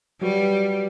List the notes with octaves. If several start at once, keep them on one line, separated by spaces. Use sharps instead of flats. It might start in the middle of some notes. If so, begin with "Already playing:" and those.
F#3 G3 F#4 B4